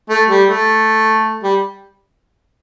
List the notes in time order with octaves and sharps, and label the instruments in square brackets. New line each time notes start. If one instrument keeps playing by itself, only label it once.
[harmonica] A3
G3
A3
G3